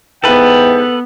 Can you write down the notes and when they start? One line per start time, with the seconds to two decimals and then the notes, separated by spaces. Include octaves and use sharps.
0.24 G#2 E3 B3 A4 B4 G5